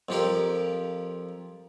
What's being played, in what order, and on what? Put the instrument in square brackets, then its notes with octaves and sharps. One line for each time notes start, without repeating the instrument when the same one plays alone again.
[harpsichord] F2 F3 G4 A#4